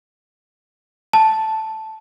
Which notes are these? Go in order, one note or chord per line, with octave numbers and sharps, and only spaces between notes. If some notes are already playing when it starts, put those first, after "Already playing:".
A5